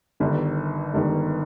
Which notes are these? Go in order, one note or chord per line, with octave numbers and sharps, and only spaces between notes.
G1 G2 D#3
G1 G2 D#3